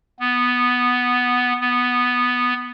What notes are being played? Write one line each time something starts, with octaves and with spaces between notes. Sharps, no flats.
B3
B3